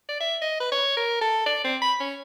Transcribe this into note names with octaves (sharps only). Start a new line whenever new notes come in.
D5
E5
D#5
B4
C#5
A#4
A4
D5
C4
B5
C#4